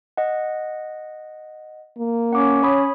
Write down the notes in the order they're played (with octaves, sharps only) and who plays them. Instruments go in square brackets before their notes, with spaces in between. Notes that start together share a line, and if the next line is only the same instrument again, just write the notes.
[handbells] D#5 F#5
[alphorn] A#3
[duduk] C#4 [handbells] F#5 D6
[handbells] C#5 B5 D#6